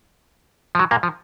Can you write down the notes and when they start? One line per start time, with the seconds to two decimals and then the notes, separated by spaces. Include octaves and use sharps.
0.75 F3
0.79 F#3
0.91 A#2 A#3
1.03 F3